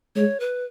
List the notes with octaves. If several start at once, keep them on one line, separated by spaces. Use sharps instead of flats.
G#3 C#5
B4